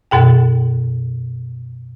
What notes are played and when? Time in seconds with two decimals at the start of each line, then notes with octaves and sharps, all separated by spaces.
0.11 F#2 B2 G#4 G5